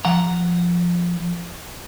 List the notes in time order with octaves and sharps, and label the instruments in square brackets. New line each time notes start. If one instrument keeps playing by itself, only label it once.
[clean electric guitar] F3 F#5 A#5